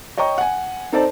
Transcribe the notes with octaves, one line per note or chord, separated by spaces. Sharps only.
C#5 D#5 G5 A#5 C#6
F#5 G#5
C4 D#4 A4 C5 D5 A5